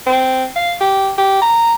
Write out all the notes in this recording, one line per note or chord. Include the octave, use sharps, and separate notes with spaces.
C4
F5
G4
G4
A#5